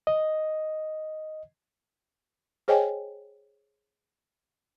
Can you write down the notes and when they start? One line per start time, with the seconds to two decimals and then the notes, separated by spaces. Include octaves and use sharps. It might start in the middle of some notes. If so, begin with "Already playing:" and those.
0.07 D#5
2.68 G#4 C5 C#5 D#5 G5 G#5